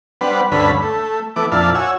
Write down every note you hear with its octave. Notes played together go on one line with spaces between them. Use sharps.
G3 B3 D4 B4 C5 F#5
D2 G2 D3 C#4 B4 B5
A3
E3 A3 B3 D6
F2 A#2 D4 E4 F5 A5
F#4 C#5 G#5 E6